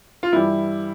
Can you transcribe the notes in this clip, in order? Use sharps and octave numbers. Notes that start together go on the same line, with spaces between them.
F4
G2 E3 G3 E4